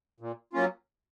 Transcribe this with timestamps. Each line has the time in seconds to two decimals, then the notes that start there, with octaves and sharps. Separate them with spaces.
0.20 A#2
0.53 F#3 A#3 C#4 F4